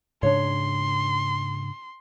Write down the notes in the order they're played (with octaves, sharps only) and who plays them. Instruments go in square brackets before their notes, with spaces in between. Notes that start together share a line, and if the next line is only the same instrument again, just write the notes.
[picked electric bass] G#2 C#3 D4 [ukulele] C#5 [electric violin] C6